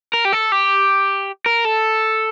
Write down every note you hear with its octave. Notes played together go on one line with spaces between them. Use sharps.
A#4
G4
A4
G4
A#4
A4